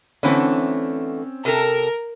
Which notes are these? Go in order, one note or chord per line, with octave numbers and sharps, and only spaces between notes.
D3 E3 A3 C4 C#4
C3 A4 A#4